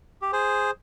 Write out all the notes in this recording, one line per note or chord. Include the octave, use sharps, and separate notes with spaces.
G4
G#4 C5